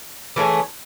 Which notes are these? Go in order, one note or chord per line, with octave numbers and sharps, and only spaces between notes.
E3 A3 C#4 G#4